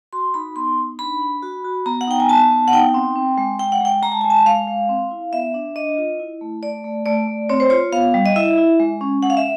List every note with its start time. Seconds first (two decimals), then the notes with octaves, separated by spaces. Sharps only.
0.13 F#4 C6
0.34 D#4 B5
0.56 B3 C6
0.78 D#4
0.99 D4 B5
1.21 D4
1.43 F#4
1.64 F#4
1.86 B3 A#5
2.01 F#5
2.08 D#4 G5
2.20 G#5
2.29 B3 A5
2.51 B3
2.68 F#5
2.73 D#4 G5
2.94 C4
3.16 C4
3.38 G#3
3.59 G#3 G5
3.72 F#5
3.81 G#3 G5
4.03 G#3 A#5
4.12 A5
4.21 G#3 G#5
4.30 A5
4.46 G#3 F5
4.67 G#3
4.89 C4
5.11 E4
5.33 B3 E5
5.54 D4
5.76 D4 D#5
5.97 F4
6.20 E4
6.41 A3
6.63 A3 D5
6.84 A3
7.06 A3 D5
7.28 A3
7.49 C4 C#5
7.60 C5
7.70 F4 C#5
7.92 B3 F5
8.14 G3
8.26 D#5
8.36 E4 E5
8.58 E4
8.80 G#3
9.01 C#4
9.23 G#3 F#5
9.30 F5
9.37 E5